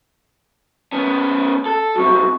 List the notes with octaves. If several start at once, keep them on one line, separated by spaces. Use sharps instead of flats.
B3 C#4
A4
B1 C3 F#4